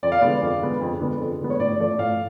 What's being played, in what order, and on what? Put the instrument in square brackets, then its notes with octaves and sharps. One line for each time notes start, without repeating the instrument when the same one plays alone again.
[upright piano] F2 D5
F5
D3 G#3 B3 D5
F2
D3 G#3 B3
F2
D3 G#3 B3
F2
D3 G#3 B3
C#5
A2 D5
F3 A3 D5
A2 F5